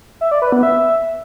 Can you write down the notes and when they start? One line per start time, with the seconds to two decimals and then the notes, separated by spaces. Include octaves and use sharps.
0.21 E5
0.31 D5
0.42 B4
0.52 B3
0.63 E5